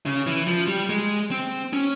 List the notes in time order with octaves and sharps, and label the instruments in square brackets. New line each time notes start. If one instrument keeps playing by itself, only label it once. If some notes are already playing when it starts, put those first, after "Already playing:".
[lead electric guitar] C#3
E3
F3
G3
G#3
C4
C#4